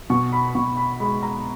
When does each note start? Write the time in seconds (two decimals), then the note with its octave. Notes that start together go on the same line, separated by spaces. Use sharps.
0.10 B2 C#6
0.32 B5
0.55 B2 C#6
0.77 B5
1.00 G#3 B5
1.23 A#5